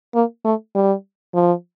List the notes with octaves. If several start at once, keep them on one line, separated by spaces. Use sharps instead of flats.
A#3
A3
G3
F3